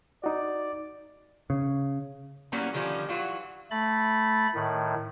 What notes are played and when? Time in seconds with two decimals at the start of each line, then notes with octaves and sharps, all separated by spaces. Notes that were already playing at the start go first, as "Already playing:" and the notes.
0.24 D#4 F#4 D5
1.50 C#3
2.52 E3 F#3 G3 A#3 C#4 F#4
2.74 D3 D#3 F3 G3 C#4
3.09 E3 F#3 F4 F#4
3.71 A3 B5 A6
4.55 A2 D#3